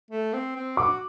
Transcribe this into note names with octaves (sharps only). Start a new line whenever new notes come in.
A3
C4
C4
F#4 D6